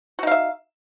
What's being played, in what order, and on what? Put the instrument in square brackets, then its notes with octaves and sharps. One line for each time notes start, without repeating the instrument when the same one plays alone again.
[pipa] F#4
D#4
F5
E5